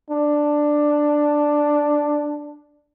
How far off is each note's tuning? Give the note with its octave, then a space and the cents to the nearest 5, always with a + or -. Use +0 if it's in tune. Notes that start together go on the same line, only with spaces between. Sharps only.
D4 +5